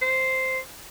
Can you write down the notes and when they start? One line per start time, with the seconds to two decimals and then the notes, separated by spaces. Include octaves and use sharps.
0.02 C5